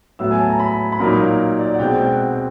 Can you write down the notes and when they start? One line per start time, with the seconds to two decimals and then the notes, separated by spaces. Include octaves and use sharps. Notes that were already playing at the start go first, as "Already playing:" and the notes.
0.19 A2 F#3 B3 E6
0.31 G#5
0.40 A5
0.50 A#5
0.59 B5
0.92 B5
0.99 A#2 F#3 A#3 D#4 A#5
1.19 F5
1.59 D5
1.74 F#5
1.79 B2 G#3 C4 G5
1.98 G5
2.06 F#5
2.31 G5